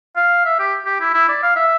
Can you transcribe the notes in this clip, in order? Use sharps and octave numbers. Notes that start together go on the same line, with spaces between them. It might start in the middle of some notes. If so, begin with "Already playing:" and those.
F5
E5
G4
G4
E4
E4
D5
F5
E5